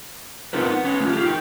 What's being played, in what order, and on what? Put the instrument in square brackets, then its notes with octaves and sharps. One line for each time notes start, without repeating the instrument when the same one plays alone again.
[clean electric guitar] B3 C4 D#4 F4 A#4 B4
B3
C#4 B4
A3 C#4 F4
F4 G4
D#4 G5